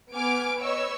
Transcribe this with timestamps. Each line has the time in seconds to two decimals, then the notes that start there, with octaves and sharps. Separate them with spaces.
0.13 B3 G#5 D6 F6 D7
0.59 B4 C#5 D#5 C#6 E6